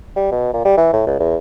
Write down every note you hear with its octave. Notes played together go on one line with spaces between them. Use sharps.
G3
B2
A#2
G3
E3
A2
C#2
E2